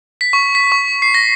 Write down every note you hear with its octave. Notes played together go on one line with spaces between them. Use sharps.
B6
C#6
B6
C#6
C7
A#6